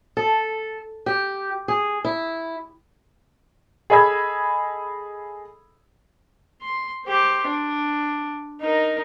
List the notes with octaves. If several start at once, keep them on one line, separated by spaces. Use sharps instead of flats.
A4
G4
G#4
E4
G#4 A4 D#5 B5 E6 G#6
C6
G4 C5
D4
D#4 A#4